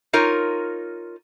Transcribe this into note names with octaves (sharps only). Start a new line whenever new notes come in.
D#4 F4 A#4 C#5